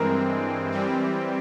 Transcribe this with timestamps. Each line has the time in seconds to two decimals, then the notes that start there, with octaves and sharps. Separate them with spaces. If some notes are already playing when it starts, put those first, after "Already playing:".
Already playing: G2 E3 G#3 C4 A#4
0.72 E3 G3 C4